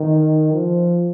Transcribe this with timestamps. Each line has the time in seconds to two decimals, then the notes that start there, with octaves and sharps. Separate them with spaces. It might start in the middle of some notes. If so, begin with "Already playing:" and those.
Already playing: D#3
0.53 F3